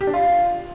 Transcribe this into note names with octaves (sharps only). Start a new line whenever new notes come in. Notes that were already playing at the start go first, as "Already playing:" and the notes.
G4
D4
F4